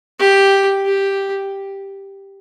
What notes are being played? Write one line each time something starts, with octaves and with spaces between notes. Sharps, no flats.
G4
G4